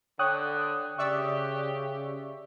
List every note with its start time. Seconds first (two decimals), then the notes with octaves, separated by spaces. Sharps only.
0.19 D3 C#5 G5 D#6 F#6
0.98 C#3 G4 D5 E5 C#6